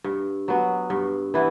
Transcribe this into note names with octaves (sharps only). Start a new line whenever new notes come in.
G2
F#3 B3
G2
E3 B3 E4